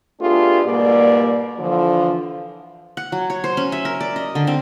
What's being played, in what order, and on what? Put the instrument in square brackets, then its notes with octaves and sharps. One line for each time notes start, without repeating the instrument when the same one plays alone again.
[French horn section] A3 B3 D4 F4 G4 G#4
G#2 B2 G3 A#3 D5
D3 E3 F3
[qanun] F#5
F#3
C#5
C5
C#4
E5
A#4
D5
D#5
D3
C4